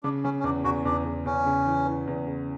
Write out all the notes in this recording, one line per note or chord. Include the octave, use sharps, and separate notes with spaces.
C#3 D4
C#3 C#4
C#4
E2 D4
E2 F#4
E2 D4
E2
E2 C#4
C#3
E3
E3
E2
C#3